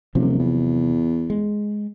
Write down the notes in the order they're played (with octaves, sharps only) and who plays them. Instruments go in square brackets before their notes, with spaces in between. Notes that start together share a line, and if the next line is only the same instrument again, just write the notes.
[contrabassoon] D#1 [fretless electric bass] C3 F3 F#3
[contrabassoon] E2
[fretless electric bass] G#3